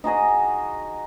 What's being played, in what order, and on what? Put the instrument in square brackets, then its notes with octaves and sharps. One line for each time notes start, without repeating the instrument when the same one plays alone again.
[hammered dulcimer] D#4 F#4 G#4 D#5